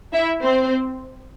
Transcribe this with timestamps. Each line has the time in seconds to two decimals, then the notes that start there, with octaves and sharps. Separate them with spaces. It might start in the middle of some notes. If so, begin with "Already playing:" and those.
0.13 E4 E5
0.42 C4 C5